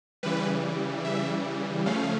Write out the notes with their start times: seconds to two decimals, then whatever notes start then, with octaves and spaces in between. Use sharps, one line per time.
0.23 C#3 E3 G3 B4
1.04 E5
1.86 C#3 F3 A3 C#4 F5